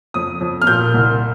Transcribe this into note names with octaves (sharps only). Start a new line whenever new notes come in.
F2 D#6
F2
F6
A#2 G6
C2